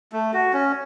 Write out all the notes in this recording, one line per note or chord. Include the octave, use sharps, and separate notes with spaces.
A3
F#4
C#4